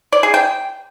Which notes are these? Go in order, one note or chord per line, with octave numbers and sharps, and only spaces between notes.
D5
G#4
G5